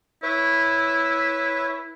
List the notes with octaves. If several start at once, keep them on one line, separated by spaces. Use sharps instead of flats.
E4 B4 C#5 E5